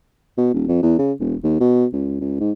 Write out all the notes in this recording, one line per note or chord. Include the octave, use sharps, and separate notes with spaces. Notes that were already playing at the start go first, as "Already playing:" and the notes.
B2
D#1
F2
E2
C#3
E1
D#2
B2
C#2
C#2
G#2